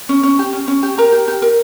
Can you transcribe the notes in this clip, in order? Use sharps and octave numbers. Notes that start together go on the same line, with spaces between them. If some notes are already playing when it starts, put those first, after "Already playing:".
C#4
C#4
G4
C#4
C#4
G4
G4 A#4 A#5
G4
G4
A#4